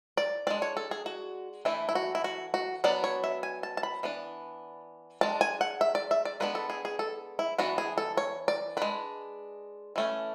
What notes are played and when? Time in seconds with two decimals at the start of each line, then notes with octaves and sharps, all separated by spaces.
0.17 D5
0.47 G#3 D4 D5
0.62 C#5
0.77 A4
0.91 G#4
1.06 F#4
1.65 E3 A3 D4 E4
1.89 E4
1.95 F#4
2.15 E4
2.24 F#4
2.54 F#4
2.84 F#3 B3 D4 D5
3.04 C#5
3.24 E5
3.43 G#5
3.63 A5
3.77 A5
3.83 B5
4.03 E3 B3 D4
5.21 G#3 D4 A5
5.41 G#5
5.61 F#5
5.81 E5
5.95 D5
6.11 E5
6.25 D5
6.40 G#3 B3 D4 B4
6.55 A4
6.70 G#4
6.85 G#4
6.99 A4
7.39 E4
7.58 E3 B3 D4 F#4
7.78 G#4
7.98 A4
8.17 C#5
8.48 D5
8.77 G#3 D4 B4
9.96 E3 A3 C#4